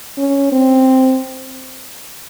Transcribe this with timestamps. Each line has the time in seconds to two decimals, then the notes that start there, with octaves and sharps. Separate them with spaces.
0.18 C#4
0.52 C4